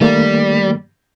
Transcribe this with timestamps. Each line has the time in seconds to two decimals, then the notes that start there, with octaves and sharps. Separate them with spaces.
0.01 D#3 G3 A3 A#3